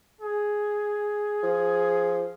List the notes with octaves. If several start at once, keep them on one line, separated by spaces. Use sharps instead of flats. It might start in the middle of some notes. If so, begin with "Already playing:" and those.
G#4
F3